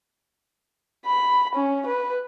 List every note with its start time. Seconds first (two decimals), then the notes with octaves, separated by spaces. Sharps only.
1.07 B5
1.56 C#4
1.87 B4